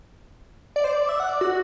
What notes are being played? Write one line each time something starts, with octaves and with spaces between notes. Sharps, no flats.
D5
C5
D5
E5
F#5
D5
F#4